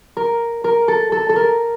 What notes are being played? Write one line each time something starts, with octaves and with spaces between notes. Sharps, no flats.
A#4
A#4
A4
A4
A4
A#4